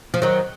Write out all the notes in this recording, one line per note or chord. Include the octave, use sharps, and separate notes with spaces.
F3
D#3 F#3